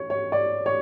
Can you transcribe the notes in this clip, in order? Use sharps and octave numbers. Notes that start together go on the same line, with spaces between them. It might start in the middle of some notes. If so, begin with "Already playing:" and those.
Already playing: C#5
C#5
D5
C#5